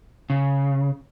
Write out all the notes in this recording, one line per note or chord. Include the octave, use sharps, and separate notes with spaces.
C#3